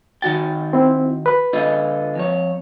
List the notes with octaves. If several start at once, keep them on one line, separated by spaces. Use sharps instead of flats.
D#3 F#4 G5 A6
C4 E4
B4
D3 F4 D#5
F2 C#5